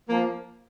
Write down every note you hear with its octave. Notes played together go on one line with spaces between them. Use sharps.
F3 A#3